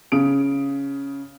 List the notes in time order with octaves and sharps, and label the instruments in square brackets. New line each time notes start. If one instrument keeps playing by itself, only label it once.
[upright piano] C#3 D#6 D7